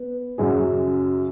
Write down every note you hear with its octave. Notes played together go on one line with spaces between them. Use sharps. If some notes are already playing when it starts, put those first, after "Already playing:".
Already playing: B3
F#2 C#3 F#3 C#4 G#4